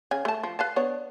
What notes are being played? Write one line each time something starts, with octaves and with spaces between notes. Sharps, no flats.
C#3 G#5
A3 A5
F3
B4 F5 A5
B3 D4 C#5